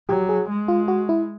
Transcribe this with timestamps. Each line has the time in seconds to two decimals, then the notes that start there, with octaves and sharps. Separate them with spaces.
0.08 F#3 G4
0.29 G#4
0.49 G#3
0.68 F4
0.88 F#4
1.09 E4